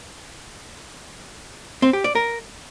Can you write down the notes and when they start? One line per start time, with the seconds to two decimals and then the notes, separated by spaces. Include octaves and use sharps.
1.82 C4
1.93 G4
2.04 D5
2.15 A#4